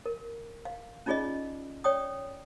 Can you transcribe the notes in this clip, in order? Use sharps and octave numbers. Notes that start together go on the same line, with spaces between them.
A#4
F5
C#4 D#4 F4 G#4 D5 D#5
C#5 D5 G5 D#6